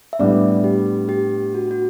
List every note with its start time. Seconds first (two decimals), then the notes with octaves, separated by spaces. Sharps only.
0.13 E5
0.19 A2 G3 B3 D4 D5
0.64 G4
1.09 G4
1.54 F#4
1.71 F#4